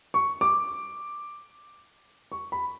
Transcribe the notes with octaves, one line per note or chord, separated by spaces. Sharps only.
C#6
D6
C#6
B5